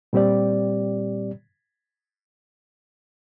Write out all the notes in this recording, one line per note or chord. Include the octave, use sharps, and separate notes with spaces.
A#2 G3 C4 G4 D5